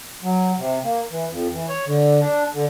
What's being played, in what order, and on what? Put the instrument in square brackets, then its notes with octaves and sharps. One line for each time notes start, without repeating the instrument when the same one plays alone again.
[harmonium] F#3
C3
A#3
E3
F2
E3
C#5
D3
D4
D3